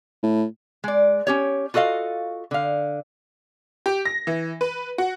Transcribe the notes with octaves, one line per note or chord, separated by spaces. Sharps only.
A2
G#3 D5
C#4 G4 C#5
F4 F#4 A4 D#5 F5
D3 F5
G4
A#6
E3
B4
F#4